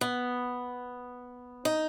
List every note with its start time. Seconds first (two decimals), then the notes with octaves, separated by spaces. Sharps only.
0.01 B3
1.65 D#4